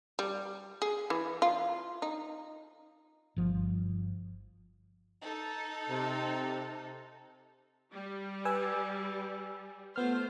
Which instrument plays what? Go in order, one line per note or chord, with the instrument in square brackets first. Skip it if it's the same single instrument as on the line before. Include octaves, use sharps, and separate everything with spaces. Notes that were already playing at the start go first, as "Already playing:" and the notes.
[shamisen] G3
G#4
E3
F4
D#4
[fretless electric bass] G1 F3
[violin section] D#4 A4
[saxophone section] C3
[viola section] G3
[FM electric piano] B4 G#5 E6
[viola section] A3 F4 C5 [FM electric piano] B3 F6